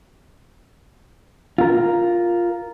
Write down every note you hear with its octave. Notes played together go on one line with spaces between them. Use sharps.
F4 A#4